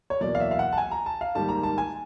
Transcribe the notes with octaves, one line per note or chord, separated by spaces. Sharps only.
C#5
E2 B2 F#3 A#3 D5
F5
E5
F5
F#5
A5
G#5
A#5
A5
F5
G#2 D#3 G3 A#3 A5
A#5
A5
G#5